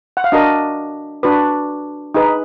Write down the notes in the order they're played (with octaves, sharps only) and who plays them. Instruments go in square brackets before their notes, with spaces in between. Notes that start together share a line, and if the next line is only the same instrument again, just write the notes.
[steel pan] F#5
F5
D4 F#4 A#4 D#5
D4 F#4 B4
D#4 G#4 B4